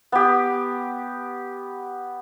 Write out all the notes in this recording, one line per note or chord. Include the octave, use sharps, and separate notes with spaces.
B3 G4